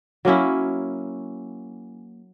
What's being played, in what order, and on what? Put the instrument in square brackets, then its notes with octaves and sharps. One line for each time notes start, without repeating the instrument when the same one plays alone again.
[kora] F#3 A#3 C#4 E4